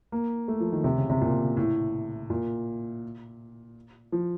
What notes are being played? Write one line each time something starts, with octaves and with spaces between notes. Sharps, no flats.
A#3
A3
F3
D#3
C3
C#3
C3
A#2
A2
A#2
F3